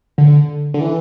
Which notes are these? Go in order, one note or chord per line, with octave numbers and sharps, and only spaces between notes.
D3
D3
E3